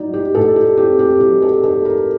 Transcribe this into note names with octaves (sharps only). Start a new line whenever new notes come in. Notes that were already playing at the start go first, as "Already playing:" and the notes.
Already playing: F#3 D#4 D5
G4
A2 A4
G4
C4 G4
G4
F#3 G4
A4
D#4 A4
A#4